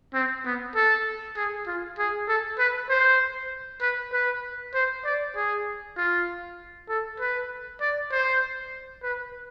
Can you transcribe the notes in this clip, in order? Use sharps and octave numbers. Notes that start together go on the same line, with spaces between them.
C4
B3
A4
G#4
F4
G#4
A4
B4
C5
B4
B4
C5
D5
G#4
F4
A4
B4
D5
C5
B4